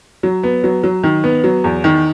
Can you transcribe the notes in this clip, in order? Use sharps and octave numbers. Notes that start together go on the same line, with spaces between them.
F#3
B3
F#3
F#3
D#3
B3
F#3
E2
D#3